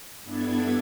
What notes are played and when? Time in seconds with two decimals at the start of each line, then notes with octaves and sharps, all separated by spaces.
0.23 G2 B3 D4 E4 A4 G#6